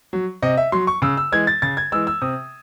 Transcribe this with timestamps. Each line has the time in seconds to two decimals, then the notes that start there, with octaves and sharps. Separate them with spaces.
0.13 F#3
0.42 C3 D#5
0.57 E5
0.72 F#3 C6
0.87 C#6
1.02 C#3 E6
1.17 E6
1.32 E3 G#3 G#6
1.47 A6
1.62 C#3 A6
1.77 G#6
1.92 E3 G#3 E6
2.07 E6
2.22 C3 D#6